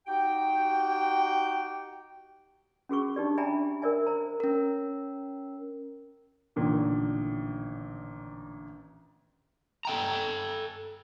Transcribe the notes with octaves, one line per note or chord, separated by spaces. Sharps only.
D#4 F#4 G4 G5
C#4 F#4 G#4 C#6
D4 D#4 G4 D5
D5 E5 G5 G#5 A#5 B5
A#4 C5 D5 E5 G#5
C5 A#5
C#4 A#4
A1 A#2 D3 D#3
A4 G5 A#5